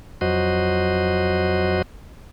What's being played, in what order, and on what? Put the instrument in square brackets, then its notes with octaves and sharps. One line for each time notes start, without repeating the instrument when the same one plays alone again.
[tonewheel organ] F2 F#3 F#4 C5 D#5